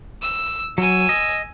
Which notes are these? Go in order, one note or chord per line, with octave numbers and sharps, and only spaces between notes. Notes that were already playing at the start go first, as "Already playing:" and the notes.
E6
F#3 G#5 E6
D#5